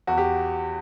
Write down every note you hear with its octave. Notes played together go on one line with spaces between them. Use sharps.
E2 F#4
G4